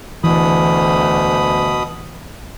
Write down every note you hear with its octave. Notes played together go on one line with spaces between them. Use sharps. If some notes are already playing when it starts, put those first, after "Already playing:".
D2 B2 E3 B5 D#6